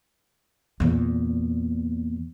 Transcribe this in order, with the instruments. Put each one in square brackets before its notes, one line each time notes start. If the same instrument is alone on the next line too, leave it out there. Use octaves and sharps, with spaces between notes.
[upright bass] E2 A#2